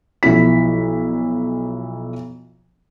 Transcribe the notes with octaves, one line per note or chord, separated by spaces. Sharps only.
B1 F3 E4 B6